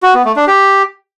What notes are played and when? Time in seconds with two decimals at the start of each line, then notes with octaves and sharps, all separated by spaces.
0.03 F#4
0.14 B3
0.25 A3
0.36 D4
0.47 G4